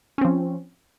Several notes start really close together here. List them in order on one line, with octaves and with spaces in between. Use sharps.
C#4 C4 F3